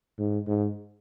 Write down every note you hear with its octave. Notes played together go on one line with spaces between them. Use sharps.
G#2
G#2